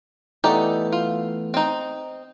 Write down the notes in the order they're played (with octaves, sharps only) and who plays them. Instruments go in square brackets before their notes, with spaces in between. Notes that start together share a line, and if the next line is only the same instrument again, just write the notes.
[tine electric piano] E3 A3 B3 [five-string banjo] D#4 G4 D5
[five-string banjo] F4
C4 D#4